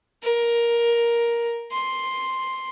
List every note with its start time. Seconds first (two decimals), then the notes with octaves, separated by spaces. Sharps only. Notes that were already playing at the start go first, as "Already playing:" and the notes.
0.23 A#4
1.72 C6